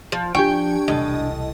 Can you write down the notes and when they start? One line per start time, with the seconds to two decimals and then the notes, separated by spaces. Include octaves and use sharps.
0.12 F3
0.35 F3 D4 G4 G5 G#5 C#6
0.88 E1 C2 A2 D#5 A5